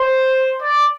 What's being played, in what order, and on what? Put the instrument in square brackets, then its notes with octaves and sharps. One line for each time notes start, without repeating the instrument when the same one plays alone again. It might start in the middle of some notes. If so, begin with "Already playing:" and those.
Already playing: [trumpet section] C5
D5